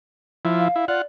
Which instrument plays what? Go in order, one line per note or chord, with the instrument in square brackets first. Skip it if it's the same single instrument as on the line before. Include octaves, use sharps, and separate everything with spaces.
[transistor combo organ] F3 E4
[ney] F5
[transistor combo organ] E4
[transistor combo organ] F4 F#5 [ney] D5